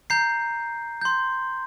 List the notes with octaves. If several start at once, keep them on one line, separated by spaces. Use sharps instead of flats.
A#5 G6 C7
C6 G6